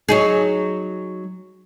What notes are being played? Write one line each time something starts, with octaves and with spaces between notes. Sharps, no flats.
F#3 D#4 G#4